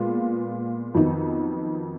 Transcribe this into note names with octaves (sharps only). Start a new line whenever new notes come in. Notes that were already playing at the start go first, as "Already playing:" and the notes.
Already playing: A#2 G#3 B3 F4
F2 D#3 F#3 B3 D#4